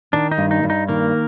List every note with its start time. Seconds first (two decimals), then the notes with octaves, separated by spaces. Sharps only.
0.13 D#3 D4
0.31 D#4
0.38 G2
0.51 D#4
0.63 G2
0.70 D#4
0.88 D#3 A#3